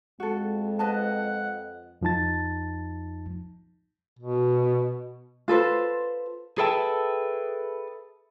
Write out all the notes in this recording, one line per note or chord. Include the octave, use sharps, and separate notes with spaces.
F2 G#3 F#4 A4
B4 D#5 F#5 A5
F2 F3 D#4 A5 A6
B2
F4 A4 B4 C5
G#4 A4 B4 E5 G5 A5